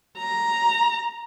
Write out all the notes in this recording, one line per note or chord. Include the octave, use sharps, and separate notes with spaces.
A#5